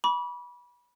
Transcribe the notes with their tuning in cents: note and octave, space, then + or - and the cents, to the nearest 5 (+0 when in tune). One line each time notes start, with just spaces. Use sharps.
B5 -25 D6 -40